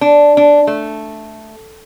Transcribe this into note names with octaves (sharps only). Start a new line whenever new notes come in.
D4
D4
A3